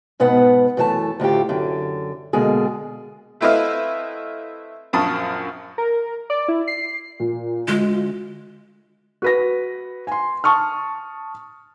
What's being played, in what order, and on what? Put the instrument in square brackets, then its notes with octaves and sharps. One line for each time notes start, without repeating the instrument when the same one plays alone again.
[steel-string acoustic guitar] G#2 B2 B3 B4 F#5
F#2 E3 A3 B4 A5
D2 A2 F4 G4
F#2 D3
B2 D3 G#3 A#3 G#4
[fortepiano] A3 C4 E4 B4 D#5 F5
A#1 F#2 A5 C#6 D#6
[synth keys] A#4
D5
E4
C7
[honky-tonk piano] A#2
[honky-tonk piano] D2 F4 [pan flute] G#3
[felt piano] F#4 B4 A#6
G#5 C6
A5 C#6 D#6 F6